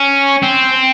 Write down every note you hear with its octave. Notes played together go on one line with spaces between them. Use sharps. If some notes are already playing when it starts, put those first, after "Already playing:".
Already playing: C#4
C4